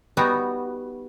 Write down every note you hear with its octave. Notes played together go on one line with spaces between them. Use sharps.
G3 B3 D#4 F#4